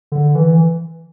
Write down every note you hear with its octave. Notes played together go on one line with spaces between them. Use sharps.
D3
E3